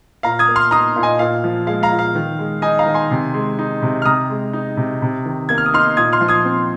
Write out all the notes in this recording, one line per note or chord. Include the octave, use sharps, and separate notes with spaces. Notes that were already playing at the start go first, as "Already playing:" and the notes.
A#2 F5 A#5
D#6 G#6
A#3
C6 F6
D#4 A#5 D#6
A#2
D#5 G#5
A#2 F5
F3
G#3 F5
F5 A#5
A#2
F5
D#3
G#3
D#4 D#5 G#5
F5 A#5
D#3
G#5 C6
C3
G#3
D#4
C3
F6
C3 A#5 D#6
G#3
D#4
C3
C3
D#3
A#3 G#6
F6
D#6
D#4 C6 F6
A#2 D#6 G#6
C6 F6
F3
D#6 G#6
C4